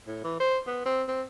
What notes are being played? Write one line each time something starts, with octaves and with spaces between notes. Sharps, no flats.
A2
E3
C5
B3
C4
C4